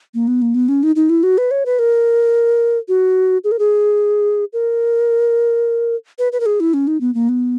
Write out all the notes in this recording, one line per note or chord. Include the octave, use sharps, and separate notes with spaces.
A#3
B3
A#3
B3
C#4
D#4
D#4
E4
F#4
B4
C#5
B4
A#4
F#4
G#4
A#4
G#4
A#4
B4
B4
A#4
G#4
E4
C#4
D#4
B3
A#3
B3